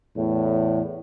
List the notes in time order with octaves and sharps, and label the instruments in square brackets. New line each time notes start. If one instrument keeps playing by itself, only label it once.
[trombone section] E2 A2